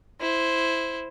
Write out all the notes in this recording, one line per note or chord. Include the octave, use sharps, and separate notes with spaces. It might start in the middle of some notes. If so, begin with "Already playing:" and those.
E4 C5